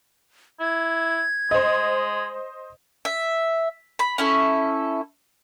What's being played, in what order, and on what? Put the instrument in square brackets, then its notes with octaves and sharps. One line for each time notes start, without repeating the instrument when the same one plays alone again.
[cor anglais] E4 [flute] G#6
[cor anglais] G#3 [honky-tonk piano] C5 D#5
[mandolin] E5
B5
C#4 E4 A4